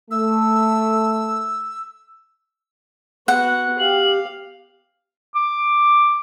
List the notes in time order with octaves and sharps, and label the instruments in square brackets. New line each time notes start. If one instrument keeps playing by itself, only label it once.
[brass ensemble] A3 [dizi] E6
[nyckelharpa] B3 F#4 [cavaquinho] F#5 [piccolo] F#6
[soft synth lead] G4 [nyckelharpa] F5 [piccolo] F#7
[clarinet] D6